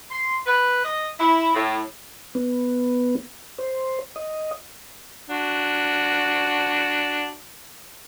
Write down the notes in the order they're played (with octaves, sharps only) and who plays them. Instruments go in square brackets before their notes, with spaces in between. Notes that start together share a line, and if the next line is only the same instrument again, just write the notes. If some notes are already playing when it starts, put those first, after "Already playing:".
[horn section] C6
B4
D#5
E4
A2
[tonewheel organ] B3
C5
D#5
[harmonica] D4 F#4